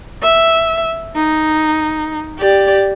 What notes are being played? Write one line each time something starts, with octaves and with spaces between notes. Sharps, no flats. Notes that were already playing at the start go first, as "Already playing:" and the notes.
E5
D#4
G4 D5